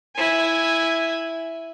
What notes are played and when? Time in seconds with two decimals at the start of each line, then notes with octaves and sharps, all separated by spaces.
0.16 E4 G#5